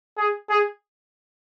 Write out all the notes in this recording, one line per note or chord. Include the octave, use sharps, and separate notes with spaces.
G#4
G#4